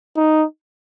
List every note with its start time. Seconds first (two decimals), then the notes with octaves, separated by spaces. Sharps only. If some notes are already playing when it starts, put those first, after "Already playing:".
0.17 D#4